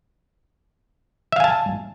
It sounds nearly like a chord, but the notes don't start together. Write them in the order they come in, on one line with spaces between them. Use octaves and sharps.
E5 F5 G#5 A5